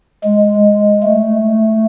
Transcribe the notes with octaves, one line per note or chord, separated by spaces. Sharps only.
G#3
A3